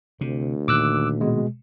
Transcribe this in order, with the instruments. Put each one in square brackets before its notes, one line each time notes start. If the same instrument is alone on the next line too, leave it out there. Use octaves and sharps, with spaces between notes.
[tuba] D2 [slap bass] C3
[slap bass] A#2 D#3 [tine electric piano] D6 E6 F#6
[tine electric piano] B2 G#3